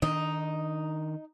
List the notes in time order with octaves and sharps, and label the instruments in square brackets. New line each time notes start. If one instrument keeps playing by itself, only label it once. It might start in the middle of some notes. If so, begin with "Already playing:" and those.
[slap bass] D#3 D4 [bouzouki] D#4